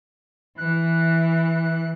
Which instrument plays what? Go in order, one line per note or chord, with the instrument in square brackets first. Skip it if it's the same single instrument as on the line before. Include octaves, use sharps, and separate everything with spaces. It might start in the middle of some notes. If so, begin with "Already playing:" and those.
[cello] E3 [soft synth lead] F#6